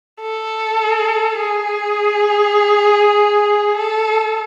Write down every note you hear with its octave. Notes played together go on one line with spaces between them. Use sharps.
A4
G#4
A4